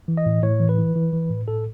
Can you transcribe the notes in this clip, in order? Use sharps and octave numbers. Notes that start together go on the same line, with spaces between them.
E3
D#5
A2
A2 C#5
E3
B4
E3
E3
E3
A2
A2 A4